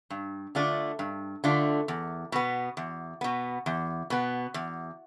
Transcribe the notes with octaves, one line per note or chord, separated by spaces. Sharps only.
G2
D3 A3 D4 F4
G2
D3 A3 D4 F4
E2
B2 B3
E2
B2 B3
E2
B2 B3
E2